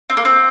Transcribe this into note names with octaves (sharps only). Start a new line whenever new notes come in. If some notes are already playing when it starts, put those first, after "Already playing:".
C4
A#3
C4